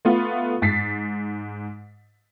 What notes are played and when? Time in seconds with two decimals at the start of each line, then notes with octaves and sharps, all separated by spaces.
0.05 A3 B3 F4
0.62 G#2 A6 B6 C7